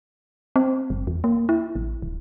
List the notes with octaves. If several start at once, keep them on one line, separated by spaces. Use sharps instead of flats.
C4
F#1
E2
A#3
E4
A1
D1